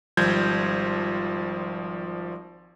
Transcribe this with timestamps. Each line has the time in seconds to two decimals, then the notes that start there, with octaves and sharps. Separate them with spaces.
0.17 G#1 F3 G3 G6 G#6